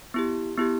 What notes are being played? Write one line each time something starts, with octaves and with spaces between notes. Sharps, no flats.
B3 E4 G4
B3 E4 G4